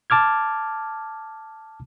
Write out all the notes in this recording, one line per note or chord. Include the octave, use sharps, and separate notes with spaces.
A5 D6 F6 G#6